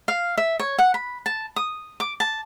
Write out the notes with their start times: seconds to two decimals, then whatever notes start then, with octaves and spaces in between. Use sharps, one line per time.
0.08 F5
0.38 E5
0.59 C#5
0.78 F#5
0.94 B5
1.26 A5
1.56 D#6
2.00 D6
2.20 A5